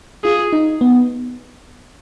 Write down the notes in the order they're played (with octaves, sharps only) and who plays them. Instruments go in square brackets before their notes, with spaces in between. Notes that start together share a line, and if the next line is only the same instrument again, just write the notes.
[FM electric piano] F4 [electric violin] G#4
[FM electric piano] D#4
B3